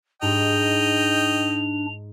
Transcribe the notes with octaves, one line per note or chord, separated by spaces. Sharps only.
G#2 D4 D#4 D#5 G5 F7